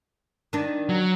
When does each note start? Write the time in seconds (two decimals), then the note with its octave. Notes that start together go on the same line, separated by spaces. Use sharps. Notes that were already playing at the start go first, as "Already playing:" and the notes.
0.53 D#3 D4
0.89 F#3